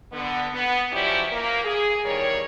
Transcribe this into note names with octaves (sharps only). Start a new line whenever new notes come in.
D3 B3
B3
F3 F#3 C#4 E4 G4 D5
A#3
G#4
E2 D#3 G3 A#4 C#5